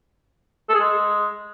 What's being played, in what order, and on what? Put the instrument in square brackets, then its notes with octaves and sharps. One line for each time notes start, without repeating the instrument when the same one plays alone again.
[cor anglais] A4
G#4
G#3